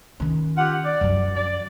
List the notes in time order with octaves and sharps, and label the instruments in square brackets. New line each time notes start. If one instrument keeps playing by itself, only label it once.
[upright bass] D#3 C#4
[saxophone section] F4 G4 F#5
D5
[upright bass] F#2 F3
[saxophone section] D5